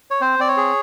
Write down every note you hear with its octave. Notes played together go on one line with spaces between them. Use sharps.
C#5
C4 C5
C4 D5
C#5
G#4